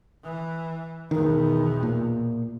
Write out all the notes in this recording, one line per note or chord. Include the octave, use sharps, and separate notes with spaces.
E3
B1 E2 D#3
A#2